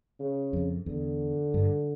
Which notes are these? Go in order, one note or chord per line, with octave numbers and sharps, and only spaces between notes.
C#3
F2
E2 D3
G2